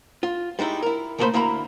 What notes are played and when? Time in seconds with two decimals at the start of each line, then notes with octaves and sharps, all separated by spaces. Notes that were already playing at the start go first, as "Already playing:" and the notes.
0.23 F4
0.59 G3 G#3 D#4 E4
0.82 E4 A#4
1.18 C#3 A3 A#3 E4 C5 B5
1.34 D2 A#3 E4 A#4 A#5 B5